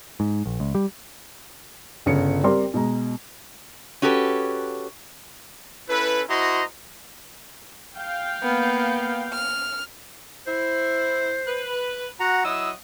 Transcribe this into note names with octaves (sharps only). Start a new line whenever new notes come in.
G#2
A#1
C#2
G3
G1 C#3 C#7
G3 C4 G4 A#4 D5 C6
B2 G#3 A#5
C#4 F#4 G4 A4 B4
C#4 E4 A4 B4
E4 F#4 C5 D#5 A#5 C6
F5 G5
A#3 B3
F6
E4 C5
B4
F#4 F#5 A#5
F#3 E4 D#5 D#6 E6